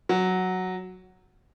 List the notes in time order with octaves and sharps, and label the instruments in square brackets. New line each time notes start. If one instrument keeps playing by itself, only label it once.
[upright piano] F#3